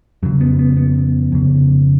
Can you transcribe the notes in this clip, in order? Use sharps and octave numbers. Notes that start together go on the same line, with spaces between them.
F2 C#3 F#3
B3
B3
B3
F2 C#3